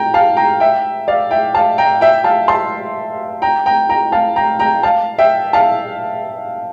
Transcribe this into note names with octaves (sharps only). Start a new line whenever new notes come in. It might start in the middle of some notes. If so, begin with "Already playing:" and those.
Already playing: G5 A#5
F5 A5
G5 A#5
E5 G5
D5 F5
E5 G5
F5 A5
G5 A#5
E5 G5
F5 A5
A5 C6
G5 A#5
G5 A#5
G5 A#5
F5 A5
G5 A#5
G5 A#5
F5 A5
E5 G5
F5 A5